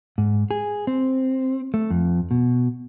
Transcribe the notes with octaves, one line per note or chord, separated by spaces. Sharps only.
G#2
G#4
C4
A3
F2
B2